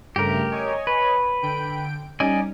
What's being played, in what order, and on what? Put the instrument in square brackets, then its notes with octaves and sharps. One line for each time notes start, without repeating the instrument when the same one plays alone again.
[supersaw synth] G2 C#3 A3 [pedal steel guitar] G4 A#4
[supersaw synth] C#5 D#5 G#5
[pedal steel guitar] B4
[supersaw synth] D3 G5 D7
[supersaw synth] G3 C#4 D#4 [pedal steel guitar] D5 D#5 G#5